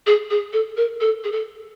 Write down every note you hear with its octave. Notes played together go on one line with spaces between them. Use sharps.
G#4
G#4
A4
A#4
A4
G#4
A4